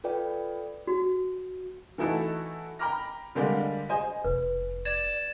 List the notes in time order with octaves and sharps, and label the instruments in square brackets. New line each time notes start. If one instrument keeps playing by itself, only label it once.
[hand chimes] F4 A4 B4 D5 G5
[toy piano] F#4
[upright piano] E3 A3 D#4 E4 F#4 A4
G5 A#5 B5 D6 F6 A#6
D3 G3 G#3 A#3 G4 D5
G#4 C5 D#5 G#5
[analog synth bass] F1 [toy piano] B4
[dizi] D5 [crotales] G#6 A6 E7